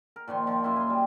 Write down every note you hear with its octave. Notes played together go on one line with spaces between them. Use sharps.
A#4
A#2 D#3 F3 C6
D#3 F3
F#2 A#3 E4 C6
G#5 C6
G3